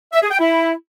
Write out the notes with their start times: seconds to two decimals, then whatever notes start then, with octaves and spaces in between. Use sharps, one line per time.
0.13 E5
0.22 G#4
0.31 G5
0.40 E4